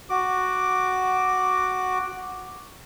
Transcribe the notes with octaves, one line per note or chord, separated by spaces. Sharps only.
F#4 D6